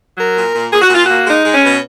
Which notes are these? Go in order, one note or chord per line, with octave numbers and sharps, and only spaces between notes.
F#3 A#4
A#2
A#2
A#2 G#4
F#4
A#2 F4
F#4
A#3
G#3 D#4
G#3
C#4
B2